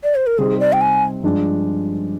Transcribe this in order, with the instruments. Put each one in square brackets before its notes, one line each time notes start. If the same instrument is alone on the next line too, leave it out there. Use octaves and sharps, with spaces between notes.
[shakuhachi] D5
C5
A#4
[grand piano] C3 G3 C4 D#4 [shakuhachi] G#4
[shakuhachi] D5
G5
G#5
[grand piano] G2 F3 G#3 D4